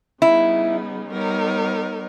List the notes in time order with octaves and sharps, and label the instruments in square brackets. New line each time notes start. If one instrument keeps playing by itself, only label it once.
[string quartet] C#3 G3 B3 D#4 [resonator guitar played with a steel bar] E4
[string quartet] G3 B3 D#4 A#4 C#5